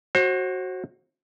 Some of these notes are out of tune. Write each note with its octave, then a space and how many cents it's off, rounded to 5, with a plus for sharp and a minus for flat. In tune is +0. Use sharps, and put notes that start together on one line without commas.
F#4 +0 C5 +35